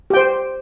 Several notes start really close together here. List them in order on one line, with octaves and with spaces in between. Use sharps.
G4 G5 C5